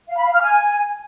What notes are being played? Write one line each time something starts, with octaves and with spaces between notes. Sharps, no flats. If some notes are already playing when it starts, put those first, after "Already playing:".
F5
B5
F5
F6
G#5